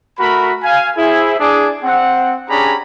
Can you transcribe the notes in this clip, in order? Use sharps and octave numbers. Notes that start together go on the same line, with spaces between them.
A3 F#4 A#4 B5
F5 G#5
E4 G#4 C5
D4 G#4 D5
C4 F#5
C#4 D4 G4 G#4 A#5 B5